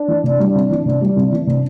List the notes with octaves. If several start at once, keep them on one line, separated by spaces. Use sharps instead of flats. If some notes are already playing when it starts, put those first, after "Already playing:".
Already playing: D4
E3
C3
G3
C2
E3
C3
G3
C2
E3
C3